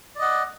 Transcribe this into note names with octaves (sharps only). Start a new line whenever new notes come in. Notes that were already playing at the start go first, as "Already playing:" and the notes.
D5 D#5 F#5